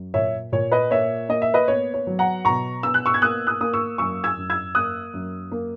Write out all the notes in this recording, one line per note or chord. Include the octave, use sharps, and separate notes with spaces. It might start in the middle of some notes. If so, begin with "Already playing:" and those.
Already playing: F#2
A#2 C#5 E5
A#2 C#5
B4 D#5
A#3 C#5 E5
A#3 D#5
E5
B4 D#5
B3 C#5
C#5
F#3
F#5 A#5
B2 A#5 C#6
B3 E6
F#6
C#6 E6
G#6
A#3 D#6 F#6
D#6 F#6
A#3 D#6
C#6 E6
F#2 C#6 E6
E6 G#6
F#2
E6 G#6
A#3 D#6 F#6
F#2
A#3